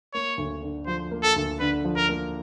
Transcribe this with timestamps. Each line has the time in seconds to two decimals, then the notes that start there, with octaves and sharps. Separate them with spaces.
0.14 A#3 C#5
0.38 D2
0.62 D3
0.86 F3 C5
1.11 A#3
1.23 A4
1.36 D2
1.60 D3 B4
1.84 F3
1.97 A#4
2.09 A#3